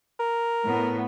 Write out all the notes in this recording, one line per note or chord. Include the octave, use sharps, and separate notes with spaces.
A#4
A2 B3